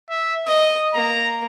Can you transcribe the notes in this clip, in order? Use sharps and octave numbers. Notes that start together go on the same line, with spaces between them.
E5
D#5 D#6
A#3 A#5